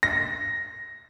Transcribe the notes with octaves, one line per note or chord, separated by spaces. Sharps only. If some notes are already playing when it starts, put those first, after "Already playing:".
A#6